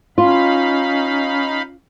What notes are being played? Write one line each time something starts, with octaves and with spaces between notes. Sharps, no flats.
C#4 D#4 F4 F5 B5